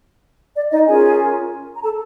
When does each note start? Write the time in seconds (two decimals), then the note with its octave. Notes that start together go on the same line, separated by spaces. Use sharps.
0.55 D5
0.71 D#4 D#5
0.86 C#4 F4 G#4 A#4 C#5 G#5
1.76 A#5
1.82 A4 A5